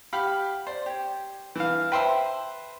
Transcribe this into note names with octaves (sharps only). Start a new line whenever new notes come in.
G4 F5 F#5 B5
C5 D5
G4 C#5
E3 F5
B4 C5 E5 G5 A5